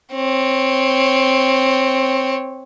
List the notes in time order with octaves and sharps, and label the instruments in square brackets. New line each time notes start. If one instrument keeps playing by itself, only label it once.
[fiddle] C4 C#5